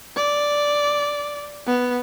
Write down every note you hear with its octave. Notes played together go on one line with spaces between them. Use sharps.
D5
B3